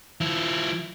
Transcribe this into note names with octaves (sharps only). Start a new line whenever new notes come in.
F3 E4